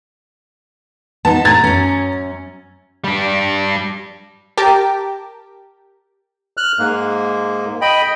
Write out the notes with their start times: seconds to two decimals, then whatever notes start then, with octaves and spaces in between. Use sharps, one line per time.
1.25 B3 D#4 A5
1.45 A3 D4 A#5 G#6 A6
1.64 F#2 C#4
3.04 G3 D4
4.57 G4 A#4 G5 A5 D6
6.57 F6 F#6
6.79 G#2 A#3
7.81 D#5 G5 B5